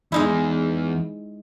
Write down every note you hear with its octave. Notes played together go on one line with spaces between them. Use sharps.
E2 G#3 D#4 E4